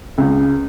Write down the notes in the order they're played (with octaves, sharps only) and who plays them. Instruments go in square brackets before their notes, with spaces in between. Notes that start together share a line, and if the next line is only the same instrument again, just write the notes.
[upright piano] C#2